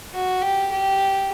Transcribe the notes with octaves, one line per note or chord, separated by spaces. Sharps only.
F#4
G4
G4